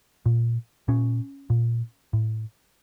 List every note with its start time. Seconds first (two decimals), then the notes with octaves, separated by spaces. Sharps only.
0.26 A#2
0.88 A#2 C#4
1.50 A#2
2.13 A2